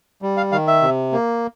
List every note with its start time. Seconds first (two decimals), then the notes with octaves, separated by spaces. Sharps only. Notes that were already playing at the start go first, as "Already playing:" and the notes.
0.22 G3
0.37 F5
0.52 D#3 F5
0.67 E5
0.82 C3
1.12 A#3